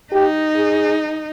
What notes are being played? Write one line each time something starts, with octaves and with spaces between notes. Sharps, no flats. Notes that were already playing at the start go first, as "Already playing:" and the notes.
D#4 G4
G#4